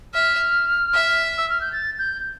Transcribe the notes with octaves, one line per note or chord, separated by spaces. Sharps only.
E5 F6
E5
E6
F6
G6
A6
G6